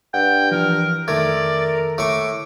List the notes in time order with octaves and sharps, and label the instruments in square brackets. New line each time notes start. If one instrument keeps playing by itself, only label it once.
[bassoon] G2 [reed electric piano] F#5 [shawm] G5
[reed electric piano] E3 F3 [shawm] A#4
[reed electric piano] F2 D#3 G#6 [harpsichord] A3 [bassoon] A#4 [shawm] D5
[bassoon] A2 [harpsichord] A3 C#6 [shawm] D6